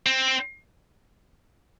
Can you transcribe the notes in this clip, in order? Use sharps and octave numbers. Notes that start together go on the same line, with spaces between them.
C4